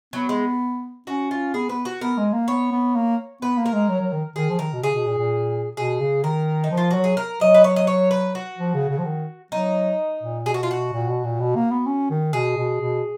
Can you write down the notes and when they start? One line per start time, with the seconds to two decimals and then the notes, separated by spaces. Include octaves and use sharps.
0.13 F#3 B3
0.29 G#3
1.07 C#4 F#4
1.31 F4
1.54 B3 G#4
1.69 B3 B4
1.85 F#4
2.01 B3 A#4
2.17 G#3
2.33 A#3
2.48 B3 C#5
2.72 B3
2.95 A#3
3.42 B3 B4
3.57 A#3
3.66 A#4
3.73 G#3
3.89 F#3
4.01 F#3
4.12 D#3
4.36 D#3 G#4
4.50 F3
4.59 D#3 A#4
4.73 B2
4.83 C#3 G#4
4.94 B2
5.06 A#2
5.18 A#2
5.77 B2 G#4
6.00 C#3
6.24 D#3 A#4
6.64 D#4
6.71 F3
6.77 F4
6.91 F#3 F#4
7.04 G#4
7.17 A#4
7.41 F#3 D#5
7.54 B4
7.64 C#5
7.76 D#5
7.87 C#5
8.11 B4
8.35 F#4
8.58 F3
8.74 C#3
8.89 C#3
8.98 F3
9.05 D#3
9.52 F#3 D#4
10.23 A#2
10.46 B2 G#4
10.54 F#4
10.63 F4
10.71 F#4
10.93 A#2
11.08 B2
11.24 A#2
11.40 B2
11.55 A#3
11.71 B3
11.87 C#4
12.10 D#3
12.33 B2 G#4
12.57 B2
12.81 B2